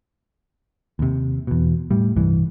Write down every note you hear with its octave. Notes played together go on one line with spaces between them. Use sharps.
D#2 C3
E2 B2
A2 G3
C2 G2 E3